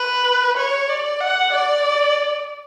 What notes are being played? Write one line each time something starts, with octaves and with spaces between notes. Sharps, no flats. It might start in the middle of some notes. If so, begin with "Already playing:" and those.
Already playing: B4
C#5
D5
F#5
D5